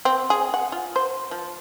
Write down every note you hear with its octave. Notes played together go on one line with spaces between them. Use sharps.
C4
G#4
F#5
F4
C5
F3